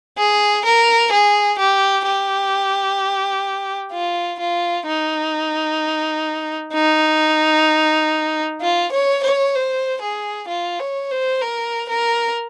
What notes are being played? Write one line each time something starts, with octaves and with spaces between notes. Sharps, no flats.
G#4
A#4
G#4
G4
G4
F4
F4
D#4
D#4
F4
C#5
C#5
C5
G#4
F4
C#5
C5
A#4
A#4